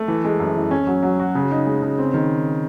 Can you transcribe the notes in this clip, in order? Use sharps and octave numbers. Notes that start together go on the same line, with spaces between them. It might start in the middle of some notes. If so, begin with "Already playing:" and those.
Already playing: A3
E3
G#3
F#2
E3
C#4
F#3
F#3
F#4
C#3
D#4
G#3
C#3
C4
D#3